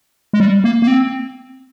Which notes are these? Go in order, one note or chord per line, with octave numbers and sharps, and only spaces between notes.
G#3
G3
A#3
A#3
C4